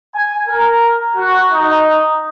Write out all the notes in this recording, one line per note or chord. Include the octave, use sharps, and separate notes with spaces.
G#5
A#4
F#4
D#4